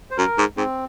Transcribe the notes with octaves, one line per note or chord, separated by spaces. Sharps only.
C5
F#2 A#4
G#2
G#2 C4